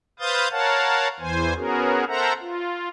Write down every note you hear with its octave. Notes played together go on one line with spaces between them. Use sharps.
B4 C5 F5 D#6 G6 A6
A#4 C#5 F5 F#5 A5
E2 E3 C5 G#5
B3 C#4 F#4 G#4 A#4
A4 A#4 C5 E5 F#5 A#5
F4